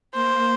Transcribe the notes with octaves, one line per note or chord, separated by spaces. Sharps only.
A#3 C5